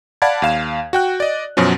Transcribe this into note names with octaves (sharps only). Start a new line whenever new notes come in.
D5 F5 F#5 A5 B5 G#6
D#2 F5 E7
F#4 G5 F#6
D5 D#5
F#2 B2 F3 F#3 C#4